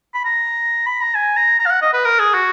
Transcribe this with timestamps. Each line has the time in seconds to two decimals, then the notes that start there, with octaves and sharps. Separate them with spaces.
0.14 B5
0.25 A#5
0.86 B5
1.01 A#5
1.15 G#5
1.37 A#5
1.59 A#5
1.66 F5
1.71 F#5
1.82 D#5
1.93 B4
2.05 A#4
2.19 G#4
2.34 F#4